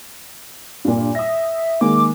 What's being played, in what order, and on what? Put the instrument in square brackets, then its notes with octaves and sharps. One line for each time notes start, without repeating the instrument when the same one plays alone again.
[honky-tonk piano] G2 A#2
[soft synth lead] E5 [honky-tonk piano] D#6 A#6
[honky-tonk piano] D#3 G#3 A#3 [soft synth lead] D6